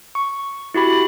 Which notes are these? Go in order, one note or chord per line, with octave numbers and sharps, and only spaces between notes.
C#6
E4 F#4 G4 B5